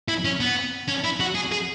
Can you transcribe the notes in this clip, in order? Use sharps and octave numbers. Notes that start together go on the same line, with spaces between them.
E4
C#4
B3
C#4
E4
F#4
G#4
G#4